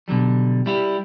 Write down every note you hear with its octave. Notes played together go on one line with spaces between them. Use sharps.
B2 D3 F#3 G3
G3 E4 G4